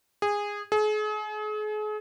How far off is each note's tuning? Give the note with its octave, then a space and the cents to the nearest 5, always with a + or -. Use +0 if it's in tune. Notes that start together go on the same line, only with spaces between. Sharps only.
G#4 -15
G#4 +40